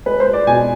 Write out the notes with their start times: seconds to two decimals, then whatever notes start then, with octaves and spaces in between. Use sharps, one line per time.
0.06 G#3 B4
0.20 C5
0.27 G#3
0.33 D5
0.47 B2 G#5